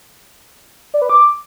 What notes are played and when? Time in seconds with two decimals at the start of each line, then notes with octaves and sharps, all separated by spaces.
0.94 D5
1.02 B4
1.09 D6